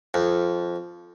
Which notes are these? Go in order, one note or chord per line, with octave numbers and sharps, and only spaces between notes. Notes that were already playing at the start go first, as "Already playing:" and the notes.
F2